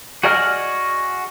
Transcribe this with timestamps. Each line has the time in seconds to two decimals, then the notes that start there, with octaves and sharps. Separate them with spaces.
0.23 F#4 G#4 D5 D#5 F6